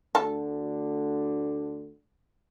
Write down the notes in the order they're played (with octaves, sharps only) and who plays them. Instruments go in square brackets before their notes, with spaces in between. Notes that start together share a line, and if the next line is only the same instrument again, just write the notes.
[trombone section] D2 D3 [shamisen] A4